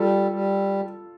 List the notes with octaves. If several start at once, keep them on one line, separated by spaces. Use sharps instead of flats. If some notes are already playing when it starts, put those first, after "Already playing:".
Already playing: G3 F4 A4
G3